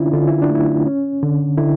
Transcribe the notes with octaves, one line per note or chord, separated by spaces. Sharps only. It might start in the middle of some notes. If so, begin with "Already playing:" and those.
Already playing: D3 C#4 D4 E4 F4
D3 F4
E4
D4
A3
E4
C#4
D3
D3 E4